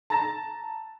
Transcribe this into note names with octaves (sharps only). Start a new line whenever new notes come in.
A5 A#5 A6 A#6 E7